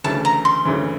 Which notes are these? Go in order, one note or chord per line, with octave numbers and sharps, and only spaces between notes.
D2 C#3 E3 A5
A#5
C6
D2 C#3 E3